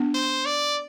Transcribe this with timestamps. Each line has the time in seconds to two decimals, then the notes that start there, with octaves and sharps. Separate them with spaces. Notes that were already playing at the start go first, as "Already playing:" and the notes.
Already playing: B3 D4
0.15 C5
0.46 D5